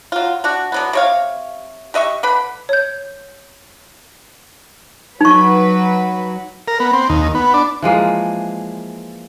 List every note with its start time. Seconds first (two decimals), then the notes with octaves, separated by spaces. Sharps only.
0.12 F#3 F4
0.44 D4 F#4
0.72 D3 F#3 B3
0.93 C3 C#5 F5
1.94 G4 D#5 E5 C#6
2.23 D3 B4 B5
2.69 C#5 G6
5.21 F#3 D#4 B4 C#6
6.68 A#4
6.80 B3
6.93 C4
7.09 D#2
7.35 B3
7.54 D4
7.82 E3 F3 G#3 A#3